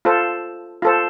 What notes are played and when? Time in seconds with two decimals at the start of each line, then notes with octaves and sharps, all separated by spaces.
0.05 F4 A4 C5
0.82 F4 A4 C5